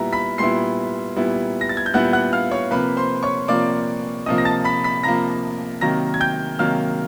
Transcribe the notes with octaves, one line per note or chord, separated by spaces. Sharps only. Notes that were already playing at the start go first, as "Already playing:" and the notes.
Already playing: A#2 G3 B3 E4 A#5
B5 B6
A#2 G3 B3 E4 C6 C7
A#2 G3 B3 E4
A#6
A6
G#6
G6
A#2 G3 B3 E4 F#5 F#6
F#5 F#6
F5 F6
C#5 C#6
C3 F3 A#3 B4 B5
C5 C6
C#5 C#6
C3 F3 A#3 D5 D6
C3 F3 A#3 D#5 D#6
A#6
A5 A6
B5 B6
B5 B6
C3 F3 A#3 A#5 A#6
C3 D#3 F#3 A#3 A#5 A#6
G#6
G5 G6
C3 D#3 F#3 A#3 F5 F6